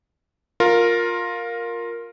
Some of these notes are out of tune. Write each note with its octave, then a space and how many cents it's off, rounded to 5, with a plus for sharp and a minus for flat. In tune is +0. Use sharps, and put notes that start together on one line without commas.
F4 +15 A#4 +0